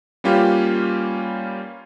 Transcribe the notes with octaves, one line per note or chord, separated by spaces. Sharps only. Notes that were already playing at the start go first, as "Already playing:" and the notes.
G3 A#3 C#4 F4 G4 B4